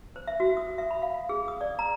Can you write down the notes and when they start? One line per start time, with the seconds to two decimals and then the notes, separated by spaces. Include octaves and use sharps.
0.16 C5
0.27 E5
0.40 F#4
0.57 D#6
0.78 E5
0.91 B5
1.02 F5
1.14 F5
1.29 G#4
1.48 D#6
1.61 D5
1.79 A#5